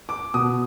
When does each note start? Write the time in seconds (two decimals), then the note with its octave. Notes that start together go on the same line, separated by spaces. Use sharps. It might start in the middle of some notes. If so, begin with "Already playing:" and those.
0.09 D6
0.34 B2 D#6